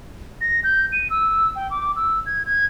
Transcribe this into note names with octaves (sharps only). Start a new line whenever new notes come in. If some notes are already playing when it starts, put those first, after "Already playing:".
A#6
G6
D#7
E6
G5
D6
E6
G#6
G#6